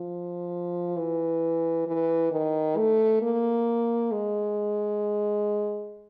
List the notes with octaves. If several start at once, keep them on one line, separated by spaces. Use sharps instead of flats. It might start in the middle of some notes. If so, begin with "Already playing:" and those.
Already playing: F3
E3
E3
D#3
A3
A#3
G#3